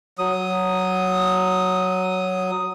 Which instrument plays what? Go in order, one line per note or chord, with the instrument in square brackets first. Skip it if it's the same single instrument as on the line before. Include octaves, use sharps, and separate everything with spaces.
[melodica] F#3 D#6